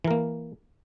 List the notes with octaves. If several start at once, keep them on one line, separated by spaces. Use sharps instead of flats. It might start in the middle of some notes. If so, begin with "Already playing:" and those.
E3 A#3 A#4